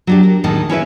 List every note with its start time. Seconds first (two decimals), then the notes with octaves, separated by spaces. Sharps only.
0.07 F#3 D4 G4
0.23 A#4
0.44 E2 A2 D#3 A3 A#4 A5
0.70 C#4 E4 B4 E5